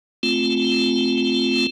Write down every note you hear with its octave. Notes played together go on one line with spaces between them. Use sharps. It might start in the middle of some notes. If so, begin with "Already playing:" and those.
A3 C4 F4